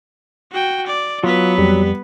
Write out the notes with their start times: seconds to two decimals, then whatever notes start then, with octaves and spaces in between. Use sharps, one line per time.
0.52 F#4 G5
0.87 D5
1.24 F#3 B3 F4 B4
1.58 F2 G3